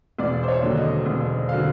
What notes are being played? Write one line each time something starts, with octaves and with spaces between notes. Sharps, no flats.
E1 D5
C5
C#5
D#2 D3 F#3
D#5
E1
D3 F#3 F5